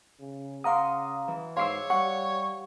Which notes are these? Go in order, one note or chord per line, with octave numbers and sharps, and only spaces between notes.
C#3
C#3 F5 F#5 A#5 C6 D6 D#6
E3
G#2 C#5 F5 C6 D6 E6 C7
G3 F#5 C#6